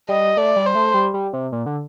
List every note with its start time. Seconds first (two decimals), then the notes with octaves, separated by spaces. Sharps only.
0.09 G3 D#5
0.37 A3 D5
0.56 G3
0.66 C5
0.75 A3
0.94 G3
1.14 G3
1.33 C3
1.52 A#2
1.66 D3